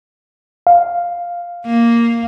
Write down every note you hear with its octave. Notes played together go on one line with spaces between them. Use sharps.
F5
A#3